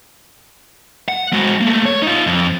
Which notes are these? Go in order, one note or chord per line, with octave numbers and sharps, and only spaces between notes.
F#5
G#3 F#4
A3 A#3
C#5
D#4 F4
F2